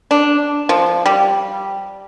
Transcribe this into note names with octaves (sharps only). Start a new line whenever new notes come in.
D4
F3
G3